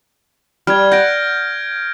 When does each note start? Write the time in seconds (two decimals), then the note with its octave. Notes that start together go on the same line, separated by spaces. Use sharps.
0.67 G3 F6 G#6
0.92 F#5 G6 A#6 D7